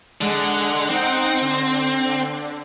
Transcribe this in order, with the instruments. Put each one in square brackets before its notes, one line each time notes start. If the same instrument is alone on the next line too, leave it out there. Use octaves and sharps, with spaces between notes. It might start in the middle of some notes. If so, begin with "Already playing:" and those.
[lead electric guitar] D3 [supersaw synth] G#3 F#5
[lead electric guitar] C4 [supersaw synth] D#4 F#5 G5
[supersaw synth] D3